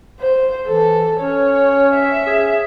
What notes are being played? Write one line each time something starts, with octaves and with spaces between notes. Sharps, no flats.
C5
E3 A4
C#4 C#5
E5
G#4